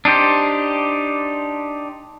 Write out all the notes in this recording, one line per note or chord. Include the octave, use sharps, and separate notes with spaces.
D4 D#4 G4 C5